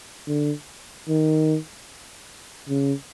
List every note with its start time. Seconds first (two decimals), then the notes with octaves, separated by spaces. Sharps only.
0.27 D3
1.09 D#3
2.69 C#3